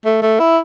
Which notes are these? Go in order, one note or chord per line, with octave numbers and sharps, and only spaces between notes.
A3
A3
E4